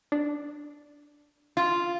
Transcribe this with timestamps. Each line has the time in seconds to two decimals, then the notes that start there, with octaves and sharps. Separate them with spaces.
0.12 D4
1.57 F4